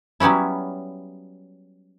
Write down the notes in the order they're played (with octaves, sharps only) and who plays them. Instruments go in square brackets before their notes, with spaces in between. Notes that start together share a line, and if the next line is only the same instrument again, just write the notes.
[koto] F#3 G3 B3 C#4 E4